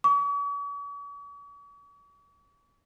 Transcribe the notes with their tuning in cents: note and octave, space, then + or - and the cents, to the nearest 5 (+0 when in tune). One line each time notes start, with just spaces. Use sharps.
C#6 +45